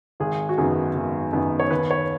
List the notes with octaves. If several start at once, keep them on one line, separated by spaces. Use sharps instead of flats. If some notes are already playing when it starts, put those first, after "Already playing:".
G#1 G#4
F#4
F#2 D#3 B3 G#4
G#1
F#2 D#3 B3
C#5
D#2 B4
C#5